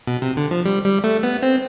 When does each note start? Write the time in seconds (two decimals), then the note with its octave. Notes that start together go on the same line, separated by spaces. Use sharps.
0.07 B2
0.22 C3
0.37 D3
0.51 F3
0.65 G3
0.85 G3
1.04 A3
1.23 B3
1.43 C4